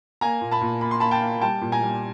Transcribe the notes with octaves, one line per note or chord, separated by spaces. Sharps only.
A#3 G#5 A#5
A#2
A5 B5
A#2
A#3 B5
C6
A#3 A5 B5
G5 A5
A#3
G3 G5 A5
A#2
G#5 A#5
G3